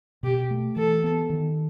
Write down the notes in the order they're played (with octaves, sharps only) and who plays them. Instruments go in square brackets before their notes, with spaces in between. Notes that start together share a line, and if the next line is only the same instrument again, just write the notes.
[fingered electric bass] B2 [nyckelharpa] G4
[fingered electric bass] A3
[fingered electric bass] E3 [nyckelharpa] A4
[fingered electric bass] B3
D#3